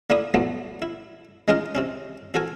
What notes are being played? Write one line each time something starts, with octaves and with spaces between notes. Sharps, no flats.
D3 A#3 D4 E4 B5 D#6
F3 F#3 A3 B3
E4
D#3 G#3 C#4 D#4 F4 A#4
C3 C4 C#4
C4 F#4 A4 A#4 G#5